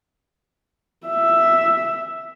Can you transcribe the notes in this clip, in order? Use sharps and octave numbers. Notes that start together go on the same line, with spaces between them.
E5